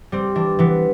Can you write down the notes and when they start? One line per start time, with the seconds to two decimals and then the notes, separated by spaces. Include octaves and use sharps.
0.12 G3 C4
0.35 E3 D4
0.59 E3 B3